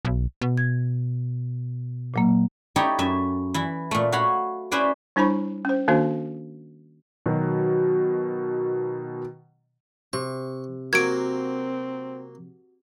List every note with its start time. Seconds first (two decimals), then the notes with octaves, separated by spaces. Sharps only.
0.05 B1
0.41 B2
0.58 G#6
2.14 A#2 F#3 A#3
2.76 D#4 E4 G4 A4 C#5
2.99 F#2 E5
3.54 E3 E4
3.91 A#2 A3
4.12 F#4 C#5 F5 B5
4.72 C#4 E4 B4 C5 D5
5.16 G3 D4 E4 C5 B5 C#6
5.65 C#4 C5
5.88 D#3 A#3 D4 F#4 C5
7.26 B2 D#3 F#3
10.13 C3 C#6
10.93 F#3 A#3 C4 F#4 G#6 D7